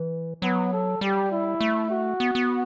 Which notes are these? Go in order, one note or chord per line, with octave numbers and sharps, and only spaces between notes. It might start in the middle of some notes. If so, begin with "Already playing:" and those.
Already playing: E3
F#3 B3
A4
G3 G4
E4
A3
F#4
B3
B3